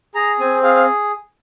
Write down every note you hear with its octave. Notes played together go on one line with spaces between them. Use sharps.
G#4 A#5
C4 G#5
G#4 F5
F5